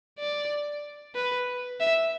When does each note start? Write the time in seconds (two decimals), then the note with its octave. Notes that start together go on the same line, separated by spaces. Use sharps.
0.19 D5
1.15 B4
1.80 E5